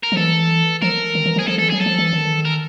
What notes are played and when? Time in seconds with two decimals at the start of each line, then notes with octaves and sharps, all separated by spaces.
0.03 A#4
0.12 F3
0.17 E3 A4
0.82 F3 A#4
1.15 D#3
1.26 E3
1.36 F3
1.39 G#4
1.47 F3 A4
1.58 E3 A4
1.69 F#3 G#4
1.80 A4
1.86 F3
1.99 E3
2.13 D#3
2.45 A#4